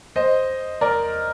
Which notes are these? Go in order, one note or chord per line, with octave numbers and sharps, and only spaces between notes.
C5 D#5
A#4 D5